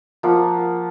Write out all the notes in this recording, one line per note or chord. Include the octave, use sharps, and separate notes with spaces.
F3 A#3 F5 F#5